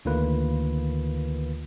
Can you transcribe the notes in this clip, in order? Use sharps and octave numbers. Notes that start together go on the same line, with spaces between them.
D2 D3 D#3 A#3 F4 B4